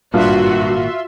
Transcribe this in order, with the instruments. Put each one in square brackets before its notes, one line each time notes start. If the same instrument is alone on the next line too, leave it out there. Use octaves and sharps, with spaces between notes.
[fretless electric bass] G#1 A#2 [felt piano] G2 [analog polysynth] F4 E5 C6 [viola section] F#4